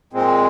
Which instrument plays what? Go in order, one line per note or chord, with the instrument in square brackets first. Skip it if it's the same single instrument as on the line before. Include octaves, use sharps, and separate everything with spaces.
[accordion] A#2 G#3 C4